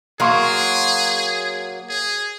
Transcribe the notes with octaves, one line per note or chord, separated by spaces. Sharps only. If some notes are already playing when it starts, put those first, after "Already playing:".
F#3 A#3 G#4 F5 C6 C#6
G#4